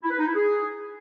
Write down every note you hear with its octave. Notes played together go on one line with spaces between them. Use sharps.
E4
B4
D#4
E4
G#4